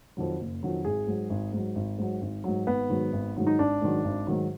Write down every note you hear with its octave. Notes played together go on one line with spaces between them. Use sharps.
F2 D#3 F#3
F#1
F2 D#3 F#3
G#1 G#4
G#2 F#3
G#1
G#2 F#3
G#1
G#2 F#3
G#1
G#2 F#3
G#1 B3
G#2 D#3 F#3
G#1
G#2 D#3 F#3
D#4
G#1 D4
G#2 D#3 F#3
G#1
G#2 D#3 F#3